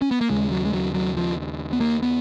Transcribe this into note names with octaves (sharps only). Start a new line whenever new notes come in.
C#4
B3
A#3
D#2 C#3 G#3
F#3
G#3
F#3
F#3
F3
B3
A#3
B3